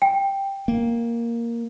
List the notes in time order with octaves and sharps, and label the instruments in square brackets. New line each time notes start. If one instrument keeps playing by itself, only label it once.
[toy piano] G5
[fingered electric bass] A#3